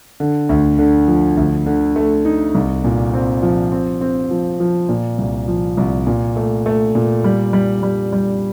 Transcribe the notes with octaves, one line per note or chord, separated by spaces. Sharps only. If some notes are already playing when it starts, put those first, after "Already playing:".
D3
D2
D3
F3
D2
D3
A3
D#4
C2
A#2
C4
F3
C4
C4
F3
F3
A#2
C2
F3
C2
A#2
A3
A3
A#2
G3
G3
G3
G3